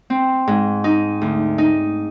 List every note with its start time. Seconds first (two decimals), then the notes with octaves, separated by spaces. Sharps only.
0.10 C4
0.47 G#2
0.84 D#4
1.21 D2
1.58 D#4